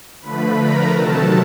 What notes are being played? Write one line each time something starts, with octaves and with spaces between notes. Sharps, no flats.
D3 F3 A3 B4 B5
A#4 A#5
C3 D#3 F#3 A3 A4 A5